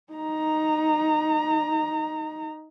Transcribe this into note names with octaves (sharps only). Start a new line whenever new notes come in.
D#4 A#5